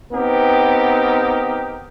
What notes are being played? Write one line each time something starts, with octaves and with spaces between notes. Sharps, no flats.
B3 C4 D#4 G4 A#4